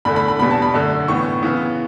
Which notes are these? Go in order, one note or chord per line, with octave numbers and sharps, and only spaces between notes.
E2 D3 A3 B5
B5
B5
E2 B2 G3 B3 B5
A5
B5
F#2 D3 A3
A2 E3 B3 C#6
C#3 E3 B3